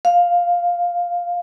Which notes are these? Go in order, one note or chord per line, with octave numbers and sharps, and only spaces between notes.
F5